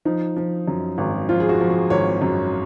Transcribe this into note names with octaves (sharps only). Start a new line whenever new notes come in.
F3 D#4
F3
F#2
G#1
F3 F4
G#4
F#4
F3
G#4
G#1 C#5
F#2